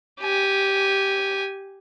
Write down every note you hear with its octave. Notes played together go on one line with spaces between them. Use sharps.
G4 G#5